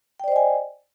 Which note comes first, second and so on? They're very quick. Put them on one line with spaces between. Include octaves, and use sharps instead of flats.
G5 D5 C5 D#5 G#5